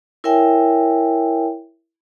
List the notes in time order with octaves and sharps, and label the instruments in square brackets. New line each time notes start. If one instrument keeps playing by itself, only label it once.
[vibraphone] E4 A#4 C#5 E5 G5 G#5